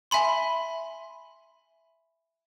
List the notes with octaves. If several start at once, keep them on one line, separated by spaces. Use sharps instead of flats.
E5 G#5 B5 C6